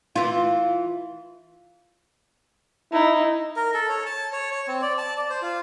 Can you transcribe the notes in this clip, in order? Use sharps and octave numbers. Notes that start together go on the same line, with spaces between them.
E3 F4
D#4 E4
A#4
A4
C#5
A5
C#5
C#5
C4
D5
A5
D5
C5
F4